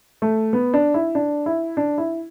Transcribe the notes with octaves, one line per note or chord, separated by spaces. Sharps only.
A3
B3
D4
E4
D4
E4
D4
E4